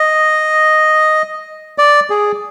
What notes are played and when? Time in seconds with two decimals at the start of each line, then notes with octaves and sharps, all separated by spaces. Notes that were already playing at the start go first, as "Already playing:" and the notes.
Already playing: D#5
1.78 D5
2.10 G#4